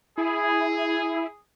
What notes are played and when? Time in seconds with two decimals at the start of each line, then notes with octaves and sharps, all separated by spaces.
0.18 E4 G#4